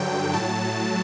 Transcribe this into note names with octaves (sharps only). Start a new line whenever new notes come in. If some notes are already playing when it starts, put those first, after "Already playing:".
Already playing: G2 D3 F#3 G5
A2 F#3 A5